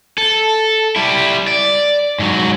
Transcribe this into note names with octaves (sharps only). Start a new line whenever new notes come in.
A4
G3 E4
D5
G#2 F#3